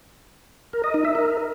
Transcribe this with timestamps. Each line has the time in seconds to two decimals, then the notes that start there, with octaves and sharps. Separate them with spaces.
0.73 A#4
0.84 D#5
0.94 D#4
1.05 E5
1.15 A#4